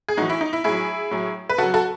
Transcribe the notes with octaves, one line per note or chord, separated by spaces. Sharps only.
G#4
A2 E3 D#4 F#4
E4
D#4
E4
A2 F#3 E4 G#4
A2 F#3
B4
C#3 F#3 F#4 A4
F#4 A4